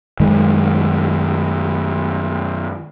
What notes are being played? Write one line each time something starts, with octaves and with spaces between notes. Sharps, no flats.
F#2 D#3 G#3